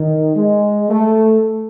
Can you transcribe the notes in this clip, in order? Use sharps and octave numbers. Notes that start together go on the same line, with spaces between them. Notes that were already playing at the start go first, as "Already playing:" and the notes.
Already playing: D#3
G#3
A3